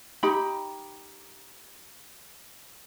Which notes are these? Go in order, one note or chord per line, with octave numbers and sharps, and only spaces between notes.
D#4 G4 B5